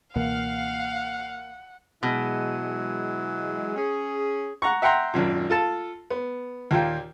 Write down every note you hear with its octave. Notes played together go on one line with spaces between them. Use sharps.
C#2 B2 E3 A#3 F5 F#5
B2 E3 F#3 G#3
C#4 G#4
F#5 A#5 C#6
E5 F#5 G5 A#5 C6
G#1 F#2 A#2
F4 A4 A5
B3
D#2 A#2 F4 G5